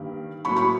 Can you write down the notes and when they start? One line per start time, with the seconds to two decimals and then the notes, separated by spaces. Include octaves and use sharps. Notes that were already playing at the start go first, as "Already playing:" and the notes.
Already playing: G2 D#3 G3 A#3
0.45 A2 F#3 A#3 B5 C#6
0.56 B5 C#6